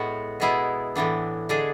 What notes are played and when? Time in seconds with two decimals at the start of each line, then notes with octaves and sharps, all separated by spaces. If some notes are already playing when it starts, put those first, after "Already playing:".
Already playing: A2 G#3 B3 F#4
0.40 B2 G#3 B3 E4 G#4
0.95 A2 E3 B3 D4
1.49 D3 G#3 D4 G#4